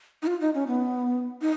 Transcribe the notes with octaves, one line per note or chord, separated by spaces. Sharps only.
D#4
F4
D#4
C#4
B3
D#4